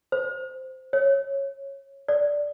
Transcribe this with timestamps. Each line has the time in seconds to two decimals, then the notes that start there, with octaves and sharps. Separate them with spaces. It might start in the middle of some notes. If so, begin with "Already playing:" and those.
0.12 C5
0.93 C#5
2.08 D5